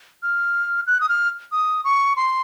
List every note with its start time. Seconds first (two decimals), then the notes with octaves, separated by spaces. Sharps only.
0.23 F6
0.87 F#6
1.01 D#6
1.09 F6
1.52 D#6
1.84 C#6
2.16 C6